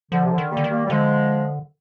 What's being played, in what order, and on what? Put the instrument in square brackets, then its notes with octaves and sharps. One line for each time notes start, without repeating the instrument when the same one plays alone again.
[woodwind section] D3 [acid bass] F3
[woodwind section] C3
D3
[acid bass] D#3
[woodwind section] G3 A#3
[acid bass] D3
D#3
[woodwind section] G3 A#3
G3
[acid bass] D3 [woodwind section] F3 G#3